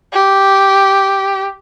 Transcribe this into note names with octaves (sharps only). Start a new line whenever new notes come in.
G4